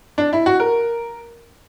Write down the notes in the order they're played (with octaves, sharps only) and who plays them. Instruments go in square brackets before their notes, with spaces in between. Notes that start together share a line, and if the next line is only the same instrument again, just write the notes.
[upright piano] D4
E4
F#4
A#4